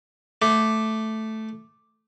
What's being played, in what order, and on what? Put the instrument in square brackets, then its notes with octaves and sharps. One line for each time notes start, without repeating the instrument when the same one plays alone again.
[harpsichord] A3 [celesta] D6